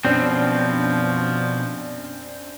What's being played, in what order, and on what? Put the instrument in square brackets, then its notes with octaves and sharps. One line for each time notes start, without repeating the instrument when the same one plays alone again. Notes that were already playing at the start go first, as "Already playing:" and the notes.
[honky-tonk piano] F#2 D4 [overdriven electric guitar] B2 [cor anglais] F3 [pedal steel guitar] C4